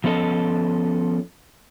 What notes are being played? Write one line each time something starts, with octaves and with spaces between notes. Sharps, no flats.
F3 B3 C#4 A4 D#5